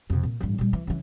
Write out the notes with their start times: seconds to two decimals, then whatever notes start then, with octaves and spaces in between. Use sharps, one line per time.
0.10 F2 B2
0.23 A#2
0.41 A1 G2
0.58 A#2 G3
0.73 E3
0.87 C#3 E3